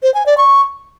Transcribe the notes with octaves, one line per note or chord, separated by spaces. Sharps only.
C5
G#5
D5
C#6